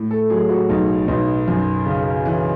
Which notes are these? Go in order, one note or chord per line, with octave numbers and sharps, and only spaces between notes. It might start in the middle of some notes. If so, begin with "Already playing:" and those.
Already playing: A2
A4
F#3 G#4
F#4
B1 D#4
B1 D#4
F#2
C#3
E3